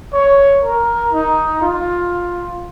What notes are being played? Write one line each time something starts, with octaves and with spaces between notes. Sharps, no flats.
C#5
A#4
D#4
F4